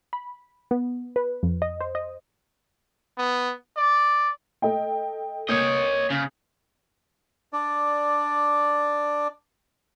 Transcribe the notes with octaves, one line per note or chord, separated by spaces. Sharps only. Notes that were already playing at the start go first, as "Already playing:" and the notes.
B5
B3
B4
F2
D#5
C5
D#5
B3
D5
A4 D#5 G5
A#3 C#5 D#5 G6
C#3
D4 D5